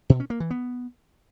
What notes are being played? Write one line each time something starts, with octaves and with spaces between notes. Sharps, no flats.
B2
C#4
A#3
E3
B3